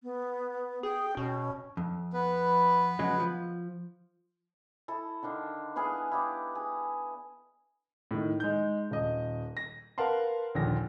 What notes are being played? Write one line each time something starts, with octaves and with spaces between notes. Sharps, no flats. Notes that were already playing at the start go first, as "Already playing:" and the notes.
B3
G#4 G5
B2 C#4
F2
B3 B4
C#3 F#3 G#3
F3
E4 A4
D3 D#3 D4 F5
B3 E4 G#4 F5
E4 G4 D5
G#4
A2 D#3
G#3 D#4 G6
D#1 D#5
A#6
A#4 B4 F5 F#5 A5 C6
A#1 D#2 A#2 D3 A#6